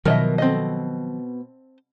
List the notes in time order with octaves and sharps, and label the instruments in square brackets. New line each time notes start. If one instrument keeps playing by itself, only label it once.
[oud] B2 [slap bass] D#3 F3 F#3 [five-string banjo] A#4 D#5 E5
[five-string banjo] C4 A4 D#5